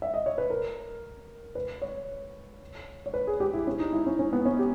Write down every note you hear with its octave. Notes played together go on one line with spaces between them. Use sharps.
E5
D#5
C#5
B4
A#4
B4
C#5
C#5
B4
G#4
G4
E4
C#4
D#4
E4
C#4
C#4
B3
C#4
G4